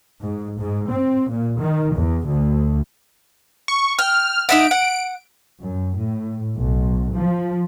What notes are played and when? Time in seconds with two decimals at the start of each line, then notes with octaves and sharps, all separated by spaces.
0.21 G#2
0.58 G#2
0.90 C4
1.31 A#2
1.60 D#3
1.94 E2
2.26 D2
3.68 C#6
3.99 G5 F6
4.49 D#4 E5 F#5 D7
4.71 F#5
5.61 F#2
5.97 A2
6.56 B1
7.17 F3